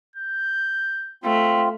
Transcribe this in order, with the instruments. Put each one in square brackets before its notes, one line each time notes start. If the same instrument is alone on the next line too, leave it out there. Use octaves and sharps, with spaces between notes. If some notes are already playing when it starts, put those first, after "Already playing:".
[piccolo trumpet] G6
[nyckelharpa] A3 [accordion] C4 F4